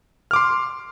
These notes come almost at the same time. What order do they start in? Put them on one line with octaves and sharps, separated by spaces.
F6 D6 C6